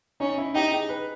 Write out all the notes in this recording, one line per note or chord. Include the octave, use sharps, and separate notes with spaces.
C#4 D#4
E4
D#4 G4
G#4
B4